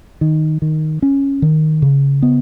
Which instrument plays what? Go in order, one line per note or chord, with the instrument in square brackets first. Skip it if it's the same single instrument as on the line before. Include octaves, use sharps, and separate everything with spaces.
[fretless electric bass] D#3
D#3
C#4
D#3
C#3
B3